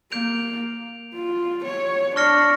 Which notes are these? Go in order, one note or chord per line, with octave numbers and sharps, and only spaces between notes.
A#3 G6 D7 F7
F4
C#5
D4 C#6 F6 A#6 C#7